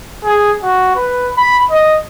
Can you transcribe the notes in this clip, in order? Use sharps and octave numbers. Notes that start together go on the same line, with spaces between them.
G#4
F#4
B4
B5
D#5